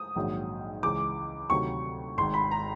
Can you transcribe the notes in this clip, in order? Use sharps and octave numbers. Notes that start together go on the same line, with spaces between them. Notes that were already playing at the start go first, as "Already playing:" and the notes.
Already playing: D#6
A#1 G#2 D#3 F#3
C#2 C#3 E3 D6
D2 C3 D#3 F#3 C#6
G#1 G#2 D#3 C6
B5
A#5